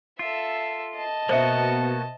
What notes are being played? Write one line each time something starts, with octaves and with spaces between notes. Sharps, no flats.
F4 A4 E5
D#5 A5
B2 A#3 B3 F#4 C5 E5